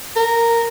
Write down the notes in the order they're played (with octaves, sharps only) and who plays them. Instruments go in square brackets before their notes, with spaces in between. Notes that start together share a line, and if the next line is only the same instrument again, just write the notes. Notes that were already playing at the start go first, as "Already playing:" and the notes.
[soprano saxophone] A#4